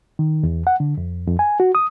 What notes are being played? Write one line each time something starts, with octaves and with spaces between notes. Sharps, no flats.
D#3
E2
F#5
D3
F2
F2
G#5
F#4
D#6